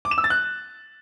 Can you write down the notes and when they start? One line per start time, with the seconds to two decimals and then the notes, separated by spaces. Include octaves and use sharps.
0.05 D6
0.11 E7
0.18 E6
0.24 A6
0.30 F#6